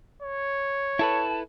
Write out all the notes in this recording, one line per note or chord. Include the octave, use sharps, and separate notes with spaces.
C#5
E4 A4 B4 A5